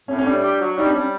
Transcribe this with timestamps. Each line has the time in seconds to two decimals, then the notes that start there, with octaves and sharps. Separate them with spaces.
0.08 A2 C#4
0.19 C#4
0.25 G3 D4
0.43 G4
0.60 F#3
0.77 G3 D#4
0.87 D4
0.95 G3 C#4